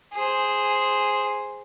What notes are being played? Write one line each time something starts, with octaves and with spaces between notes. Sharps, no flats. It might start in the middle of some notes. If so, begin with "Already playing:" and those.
G#4 C5